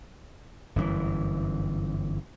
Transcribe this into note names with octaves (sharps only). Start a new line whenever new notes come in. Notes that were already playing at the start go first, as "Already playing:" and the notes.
G1 F#2 B2 E3